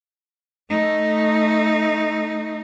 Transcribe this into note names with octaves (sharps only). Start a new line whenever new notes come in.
A3 D#4